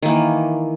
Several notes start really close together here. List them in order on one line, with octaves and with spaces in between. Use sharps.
D#3 A#3 E3